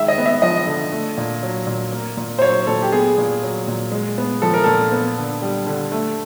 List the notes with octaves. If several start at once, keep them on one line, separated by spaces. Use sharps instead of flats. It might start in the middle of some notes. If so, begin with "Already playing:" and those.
Already playing: D#3 G#3 E5
D#5
B3
E5
F3 D#5
D3
A3
A#2
F#3
A#2
A#3
A#2
C5
F#3 C#5
A#2 A4
G4
B3 G#4
A#2
F#3
A#2
G#3
B3
F3 A4
A#4
A#2 A4
B3
D3
G3
D3
A3